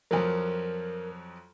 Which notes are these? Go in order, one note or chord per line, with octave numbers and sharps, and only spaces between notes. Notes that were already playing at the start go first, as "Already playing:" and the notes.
F2 F3 F#3 A#4